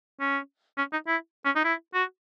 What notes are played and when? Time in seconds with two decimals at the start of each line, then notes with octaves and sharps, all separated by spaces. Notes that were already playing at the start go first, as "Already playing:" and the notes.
0.20 C#4
0.78 C#4
0.93 D#4
1.07 E4
1.45 C#4
1.56 D#4
1.65 E4
1.95 F#4